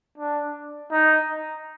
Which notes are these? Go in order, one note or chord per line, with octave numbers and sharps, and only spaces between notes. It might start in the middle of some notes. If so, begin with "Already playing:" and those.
D4
D#4